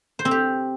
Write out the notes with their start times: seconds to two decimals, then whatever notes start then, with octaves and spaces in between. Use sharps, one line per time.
0.19 C5
0.25 C4
0.31 G4